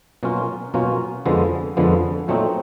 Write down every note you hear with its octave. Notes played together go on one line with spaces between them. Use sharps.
B2 F#3 A#3 C#4 F4
B2 F#3 A#3 C#4 F4
F2 D3 F3 G#3 B3
F2 D3 F3 G#3 B3
A#2 F#3 A3 C4 D#4